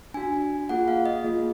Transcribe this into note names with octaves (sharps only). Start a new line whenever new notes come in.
D4 F#4 G#5
A#3 F4 G#4 F#5
F5
D#5
A#3 F4 G#4